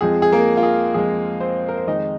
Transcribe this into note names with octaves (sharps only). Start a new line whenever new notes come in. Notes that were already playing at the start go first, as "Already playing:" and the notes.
F2 F3 G#3 G#4
G#4
A#3 A#4
F4
G#4
F2 F3 G#3 G#4
C4 C5
A#4
C5
F2 D#3 G#3 D#4 D#5